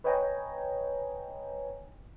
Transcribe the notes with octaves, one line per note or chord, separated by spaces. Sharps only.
B4 C#5 D#5 G5 G#5 A#5